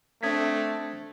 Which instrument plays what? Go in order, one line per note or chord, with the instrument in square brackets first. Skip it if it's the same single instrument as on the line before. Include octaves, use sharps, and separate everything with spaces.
[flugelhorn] A3 [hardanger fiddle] C4 D4 [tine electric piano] D#6 G#6 B6